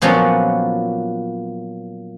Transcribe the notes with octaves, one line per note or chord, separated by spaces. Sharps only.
A#2 F3 F#3 B3 C#4 D4